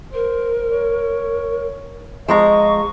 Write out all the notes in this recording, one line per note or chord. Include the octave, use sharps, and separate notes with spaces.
A#4 C5
C#5
F3 G#3 D#5 A#5 C#6